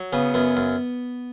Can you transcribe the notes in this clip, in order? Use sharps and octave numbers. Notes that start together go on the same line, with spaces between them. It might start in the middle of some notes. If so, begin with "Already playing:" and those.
Already playing: F#3
C#3 B3
F#2 B3
F#2